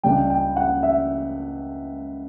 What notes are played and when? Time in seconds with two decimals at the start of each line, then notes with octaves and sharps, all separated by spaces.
0.03 C#2 C#3 G3 D4 G5
0.30 G5
0.56 F#5
0.83 E5